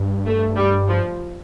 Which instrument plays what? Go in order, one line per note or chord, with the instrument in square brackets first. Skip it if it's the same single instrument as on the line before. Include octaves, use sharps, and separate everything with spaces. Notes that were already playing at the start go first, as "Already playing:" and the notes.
Already playing: [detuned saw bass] G2
[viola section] A3
G3
F3